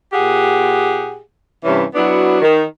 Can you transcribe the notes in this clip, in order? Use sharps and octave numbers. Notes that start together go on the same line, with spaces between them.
A#2 G4 G#4 F#5
G2 C3 E3 C#4
F#3 B3 D4 E4 F#4
D#3